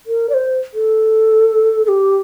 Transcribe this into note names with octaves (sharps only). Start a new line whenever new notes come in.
A#4
D5
C5
A4
A4
G4